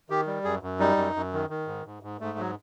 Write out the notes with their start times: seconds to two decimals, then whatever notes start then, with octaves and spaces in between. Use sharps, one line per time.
0.10 D#3 G4
0.27 G3
0.44 F#2 G#4
0.63 F#2
0.80 G3 D#4
0.97 F#2
1.16 F#2
1.33 D#3
1.50 D#3
1.67 G#2
1.86 G#2
2.03 G#2
2.21 G#2 A3
2.38 F#3